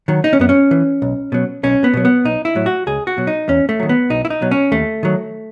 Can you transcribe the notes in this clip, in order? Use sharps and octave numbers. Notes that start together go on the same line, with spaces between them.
D#3 F#3
D#4
C#4
F#2 B3
C#4
E3
B1
B2 F#3
B1 C#4
B3
B2 F#3
B3
B1 D#4
E4
A2 F#3
F#4
C#2 G#4
F#4
B2 F#3
D#4
E2 C#4
A3
D#3 F#3
B3
B1 D#4
E4
D#4
B2 F#3
C#4
D#2 A3
D#3 F#3